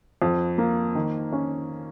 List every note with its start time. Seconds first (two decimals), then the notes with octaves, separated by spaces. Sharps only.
0.22 F2
0.58 A#3
0.95 D#3
1.32 C#4